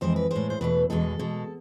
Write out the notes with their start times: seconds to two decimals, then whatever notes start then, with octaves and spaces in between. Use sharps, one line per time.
0.01 F2 E3 G#3 C5
0.16 B4
0.31 A2 G#3 C5
0.50 C5
0.61 E2 B2 A3 B4
0.90 E2 B2 G#3 A4
1.19 B2 G#3